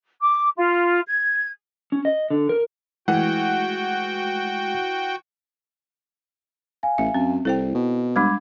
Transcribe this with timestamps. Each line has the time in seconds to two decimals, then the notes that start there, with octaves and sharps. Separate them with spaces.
0.22 D6
0.57 F4
1.07 G#6
1.92 C#4
2.05 D#5
2.30 D3
2.49 A#4
3.08 E3 G#3 A3 E4 F#4 F#5 G5
6.83 F5 G#5
6.98 A1 E5
7.14 F#2 C4
7.45 C2 E4 A4 C5 G5
7.75 B2
8.16 G3 G#3 D4 B5 D6 G#6